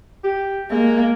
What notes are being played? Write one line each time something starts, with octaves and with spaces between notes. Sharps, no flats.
G4
G#3 A#3